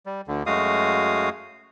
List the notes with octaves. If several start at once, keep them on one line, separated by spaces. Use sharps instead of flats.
G3
D2 D3
F#2 G#3 A3 F#4 F5 D#6